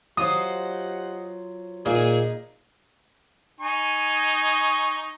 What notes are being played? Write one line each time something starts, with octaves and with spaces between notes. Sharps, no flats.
F#3 F4 G4 C5 D#5 F#5 D#6
A#2 D#4 G#4
D#4 G#5 C#6